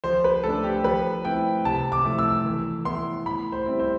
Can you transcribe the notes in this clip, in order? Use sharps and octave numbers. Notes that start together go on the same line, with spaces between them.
F3 C5
B4
A3 D4 A4
G4
F3 B4
A3 C4 E4 G5
C3 A5
D6
F3 A3 E4
E6
E3
B3 E4 C6
A2 B5
C5
G3 C4 E4
C5